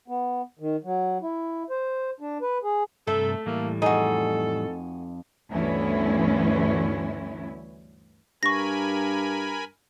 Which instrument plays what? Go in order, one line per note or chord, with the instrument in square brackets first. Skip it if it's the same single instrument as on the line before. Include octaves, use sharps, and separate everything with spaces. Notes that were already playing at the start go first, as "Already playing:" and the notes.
[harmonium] B3
D#3
F#3
E4
C5
D4
B4
G#4
[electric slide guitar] G2 C3 A#5 [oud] A3 [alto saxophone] A4 [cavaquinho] E5
[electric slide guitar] A2 E3 G3 [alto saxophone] A#3
[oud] F2 D#4 [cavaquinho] F#4 G#4 [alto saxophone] A4
[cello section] D2 G2 E3 B3 C#4 E4
[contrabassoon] G2 [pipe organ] A#4 G#5 B5 [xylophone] C#6 A#6